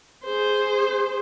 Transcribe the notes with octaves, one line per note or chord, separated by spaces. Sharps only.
G#4 C5